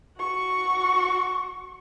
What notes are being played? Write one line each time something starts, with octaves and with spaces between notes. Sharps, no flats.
F#4 C#6